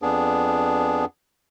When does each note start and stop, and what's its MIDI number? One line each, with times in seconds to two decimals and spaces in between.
0.02 1.05 41
0.02 1.05 59
0.02 1.05 62
0.02 1.05 68